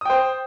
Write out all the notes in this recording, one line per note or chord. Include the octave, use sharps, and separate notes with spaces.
C5 G5 D#6